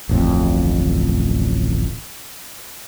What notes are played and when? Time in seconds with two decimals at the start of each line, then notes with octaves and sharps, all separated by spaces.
0.09 D1 A1 F2